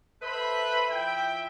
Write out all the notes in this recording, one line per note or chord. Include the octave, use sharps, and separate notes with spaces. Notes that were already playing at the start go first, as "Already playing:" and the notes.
A4 B4 C5 E5 B5
F3 E4 E5 G5